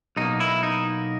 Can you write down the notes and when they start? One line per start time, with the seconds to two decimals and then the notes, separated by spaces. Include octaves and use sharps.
0.16 B1 B2 A#3 D#4
0.40 E4
0.63 D#4